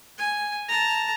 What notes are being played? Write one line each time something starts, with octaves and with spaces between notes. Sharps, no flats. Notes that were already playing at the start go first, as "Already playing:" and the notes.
G#5
A5 A#5